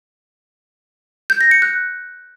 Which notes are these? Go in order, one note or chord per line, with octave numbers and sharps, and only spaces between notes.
G6
A#6
C#7
F#6